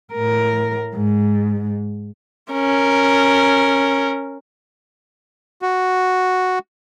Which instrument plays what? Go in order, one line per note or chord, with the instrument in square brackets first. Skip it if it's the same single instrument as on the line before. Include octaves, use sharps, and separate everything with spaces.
[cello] A2 A#4
G#2
[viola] C#4 A#4
[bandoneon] F#4